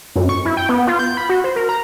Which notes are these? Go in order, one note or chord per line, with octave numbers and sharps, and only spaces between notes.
F#2
C#6
E4
G5
B3
F4
G6
B5
F#4
C5
A#4
A#5